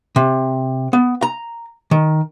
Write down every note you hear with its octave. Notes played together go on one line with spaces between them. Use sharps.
C3
B3
A#5
D#3